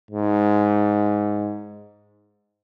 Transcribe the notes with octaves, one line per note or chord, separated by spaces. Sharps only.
G#2